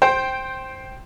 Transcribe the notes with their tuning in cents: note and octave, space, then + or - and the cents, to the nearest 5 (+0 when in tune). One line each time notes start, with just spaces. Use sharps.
C5 +10 G5 -5